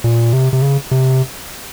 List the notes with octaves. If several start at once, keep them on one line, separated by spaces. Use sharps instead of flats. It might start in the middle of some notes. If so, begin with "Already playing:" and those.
A#2
C3
C3
C#3
C3